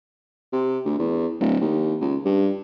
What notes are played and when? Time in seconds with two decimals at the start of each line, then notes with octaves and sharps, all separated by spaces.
0.53 C3
0.85 D2
0.99 E2
1.40 D1
1.61 D#2
2.01 C#2
2.25 G2